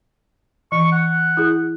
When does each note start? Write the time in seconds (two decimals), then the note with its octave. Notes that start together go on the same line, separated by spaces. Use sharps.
0.72 E3 C#6
0.92 F#5
1.37 E4 G#4